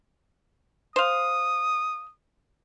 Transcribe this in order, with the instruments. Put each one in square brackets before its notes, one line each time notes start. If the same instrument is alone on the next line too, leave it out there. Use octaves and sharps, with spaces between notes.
[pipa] C5 F5 [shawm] D#6